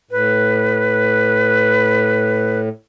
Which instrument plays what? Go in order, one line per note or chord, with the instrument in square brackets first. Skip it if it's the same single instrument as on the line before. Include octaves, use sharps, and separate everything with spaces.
[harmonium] A2 [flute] B4